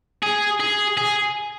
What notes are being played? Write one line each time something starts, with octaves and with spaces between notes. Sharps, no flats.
G#4
G#4
G#4